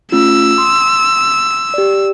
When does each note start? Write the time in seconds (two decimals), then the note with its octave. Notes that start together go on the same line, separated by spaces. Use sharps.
0.12 A3 C#4 F4 E6
0.57 C6 D#6
1.74 G4 D5